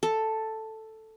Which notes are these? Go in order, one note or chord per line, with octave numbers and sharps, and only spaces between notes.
A4